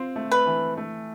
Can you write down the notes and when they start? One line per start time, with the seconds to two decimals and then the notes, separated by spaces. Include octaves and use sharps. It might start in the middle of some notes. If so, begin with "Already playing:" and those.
Already playing: C4 F4
0.16 A3
0.32 B4
0.46 E3
0.77 A3